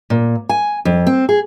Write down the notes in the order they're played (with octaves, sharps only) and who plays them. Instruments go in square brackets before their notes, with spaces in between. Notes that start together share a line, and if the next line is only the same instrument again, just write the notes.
[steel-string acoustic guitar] A#2
G#5
F2
C4
G#4